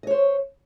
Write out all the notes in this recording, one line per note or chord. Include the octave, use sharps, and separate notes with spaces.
C5 C#5 D#5